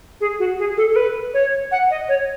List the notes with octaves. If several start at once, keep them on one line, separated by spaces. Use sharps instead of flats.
G#4
F#4
G#4
A4
A4
B4
C#5
F#5
D#5
C#5